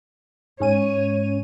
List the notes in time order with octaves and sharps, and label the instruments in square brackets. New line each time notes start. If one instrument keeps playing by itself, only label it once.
[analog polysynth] G#2 C#4 D#7 [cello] C#5